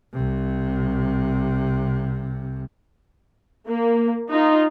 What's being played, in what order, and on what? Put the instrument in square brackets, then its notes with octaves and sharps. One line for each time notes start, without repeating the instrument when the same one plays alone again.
[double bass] C2 C3
[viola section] A#3
D#4 F4